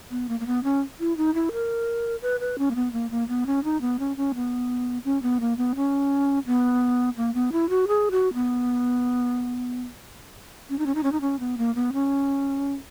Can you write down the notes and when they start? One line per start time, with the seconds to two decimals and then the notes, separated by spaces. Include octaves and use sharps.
0.11 B3
0.29 A#3
0.40 A#3
0.46 B3
0.64 C#4
1.00 E4
1.17 D#4
1.34 E4
1.52 A#4
2.22 B4
2.40 B4
2.58 C#4
2.71 A#3
2.75 B3
2.93 A#3
3.11 A#3
3.28 B3
3.46 C#4
3.64 D#4
3.81 B3
3.99 C#4
4.17 C#4
4.35 B3
5.05 C#4
5.22 B3
5.40 A#3
5.57 B3
5.76 C#4
6.46 B3
7.17 A#3
7.34 B3
7.52 E4
7.69 F#4
7.88 G#4
8.11 F#4
8.34 B3
10.69 C#4
10.79 D#4
10.86 C#4
10.95 D#4
11.03 C#4
11.12 D#4
11.21 C#4
11.40 B3
11.58 A#3
11.75 B3
11.93 C#4